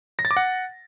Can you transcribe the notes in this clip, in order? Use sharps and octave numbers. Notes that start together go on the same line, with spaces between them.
A#6
A6
D6
F#5